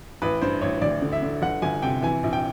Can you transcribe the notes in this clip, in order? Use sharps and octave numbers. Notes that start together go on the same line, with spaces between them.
A1 B4
G2 C5
A1 C#5
D2 D5
D3
E5
D3
G1 F#5
G1 G#5
C3 G5
E3 G#5
A#1
G5